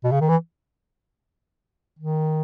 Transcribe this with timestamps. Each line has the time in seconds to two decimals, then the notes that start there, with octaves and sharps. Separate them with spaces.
0.04 B2
0.12 C#3
0.21 D#3
0.29 E3
1.99 D#3